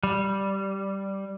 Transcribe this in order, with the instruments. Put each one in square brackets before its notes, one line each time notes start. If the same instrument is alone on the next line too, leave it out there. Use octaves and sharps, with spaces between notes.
[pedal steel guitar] G3